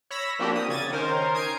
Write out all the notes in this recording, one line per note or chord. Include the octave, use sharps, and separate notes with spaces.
C#5 B5 E6 A#6 B6
F3 A#3 C4 D4 F#4 G4
D#6
C#3 G#6 A6 D#7
D#3 C#4 A#4 C5
D#6 G#6 C7 D7